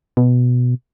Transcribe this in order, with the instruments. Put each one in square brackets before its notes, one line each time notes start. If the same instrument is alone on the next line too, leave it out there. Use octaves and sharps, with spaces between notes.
[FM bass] B2